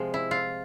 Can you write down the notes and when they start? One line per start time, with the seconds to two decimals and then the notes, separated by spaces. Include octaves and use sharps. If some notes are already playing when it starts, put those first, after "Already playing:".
Already playing: C3 F3 G#3
0.14 E4
0.31 F4